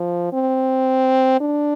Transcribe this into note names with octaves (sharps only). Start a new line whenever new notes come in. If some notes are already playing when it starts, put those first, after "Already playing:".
Already playing: F3
C4
D4